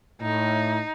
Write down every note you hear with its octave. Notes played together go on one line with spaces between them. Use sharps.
A2 D#4